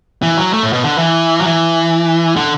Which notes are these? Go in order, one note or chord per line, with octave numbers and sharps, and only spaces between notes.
E3
F#3
A3
A2
B2
D3
E3
F#3
E3
D3